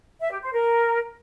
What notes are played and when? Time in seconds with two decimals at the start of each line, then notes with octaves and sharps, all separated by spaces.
0.20 E5
0.31 G4
0.42 C5
0.53 A#4